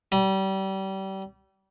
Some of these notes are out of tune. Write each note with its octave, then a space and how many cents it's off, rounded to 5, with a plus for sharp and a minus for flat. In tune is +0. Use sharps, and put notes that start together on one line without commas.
G3 -30